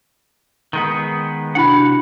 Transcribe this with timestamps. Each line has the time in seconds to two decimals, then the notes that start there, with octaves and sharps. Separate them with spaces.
0.73 D#3 G#3 B3
1.55 C3 D4 E4 F#4 F#5 B5